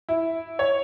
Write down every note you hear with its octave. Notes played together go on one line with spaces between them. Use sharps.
E4
C#5